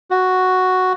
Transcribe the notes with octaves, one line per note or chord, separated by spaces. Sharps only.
F#4